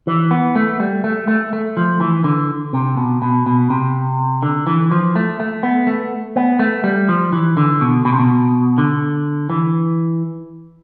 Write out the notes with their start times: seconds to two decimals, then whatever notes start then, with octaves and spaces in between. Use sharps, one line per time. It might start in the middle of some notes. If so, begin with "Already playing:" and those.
0.07 E3
0.31 B3
0.56 A3
0.80 G3
1.04 A3
1.28 A3
1.53 A3
1.77 F3
2.01 E3
2.24 D3
2.73 C3
2.97 B2
3.22 B2
3.46 B2
3.70 C3
4.42 D3
4.67 E3
4.91 F3
5.16 A3
5.40 A3
5.63 B3
5.87 A3
6.36 B3
6.59 A3
6.84 G3
7.09 F3
7.32 E3
7.57 D3
7.81 B2
8.05 B2
8.12 C3
8.20 B2
8.78 D3
9.50 E3